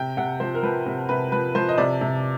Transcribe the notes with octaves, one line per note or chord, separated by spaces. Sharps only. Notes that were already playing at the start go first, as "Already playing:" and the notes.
Already playing: C3 G5
C3 F#5
F3 C5
A#4
F3 B4
C3
C3 B4
F3 B4
F3 C5
D#5
C3 D5
C3